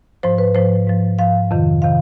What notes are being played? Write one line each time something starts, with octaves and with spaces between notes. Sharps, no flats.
G#2 F3 C5
B4
G#2 F3 C5
G#2 F3
G#2 F3 F5
F2 C3 D#3
C3 D#3 F5